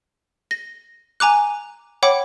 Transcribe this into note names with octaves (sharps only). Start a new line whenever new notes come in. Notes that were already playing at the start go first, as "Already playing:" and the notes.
A#6
G#5 A#5 D6 F#6
C#5 F#5 G5 B5 D6